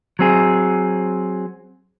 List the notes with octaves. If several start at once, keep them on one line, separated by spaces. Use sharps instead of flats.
F#3 C4 G#4